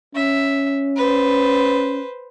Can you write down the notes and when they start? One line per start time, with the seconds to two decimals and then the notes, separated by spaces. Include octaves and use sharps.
0.15 C#4 E5
0.96 B4 C5